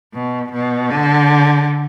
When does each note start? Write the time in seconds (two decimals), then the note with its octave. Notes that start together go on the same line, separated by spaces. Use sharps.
0.14 B2
0.52 B2
0.90 D3